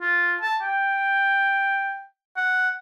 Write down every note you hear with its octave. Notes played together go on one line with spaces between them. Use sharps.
F4
A5
G5
F#5